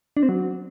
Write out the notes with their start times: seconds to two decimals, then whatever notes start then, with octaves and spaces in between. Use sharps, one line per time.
0.17 D4
0.23 C4
0.29 F#3